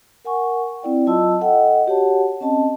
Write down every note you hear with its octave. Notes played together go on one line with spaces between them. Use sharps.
A#4 F#5 G#5 C#6
C4 E4 D5 G5
F#3 F4 D#5 A5 C6 E6
A4 D#5 F#5 G5
F#4 G4 C#5 F#5 A5
C4 C#4 D#5 A5